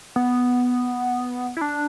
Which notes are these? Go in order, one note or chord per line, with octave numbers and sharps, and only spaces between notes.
B3
E4
D4